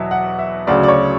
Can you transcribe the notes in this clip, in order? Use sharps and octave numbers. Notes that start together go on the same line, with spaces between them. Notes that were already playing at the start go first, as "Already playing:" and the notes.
Already playing: E2 B2 F#3 E5
F#5
E5
D2 C#3 F#3 D5
D5
C#5